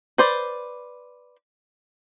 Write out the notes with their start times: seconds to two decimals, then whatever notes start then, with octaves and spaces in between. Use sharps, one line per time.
0.18 B4 C5 D5